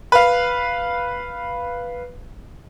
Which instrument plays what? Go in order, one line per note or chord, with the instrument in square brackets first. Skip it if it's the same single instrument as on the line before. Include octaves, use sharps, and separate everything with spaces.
[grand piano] B4 F5